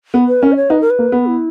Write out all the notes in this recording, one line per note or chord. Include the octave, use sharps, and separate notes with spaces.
B3
B4
C#4 A#4
D#5
C#5
D#4 B4
A#4
B4
A#3
B3
E4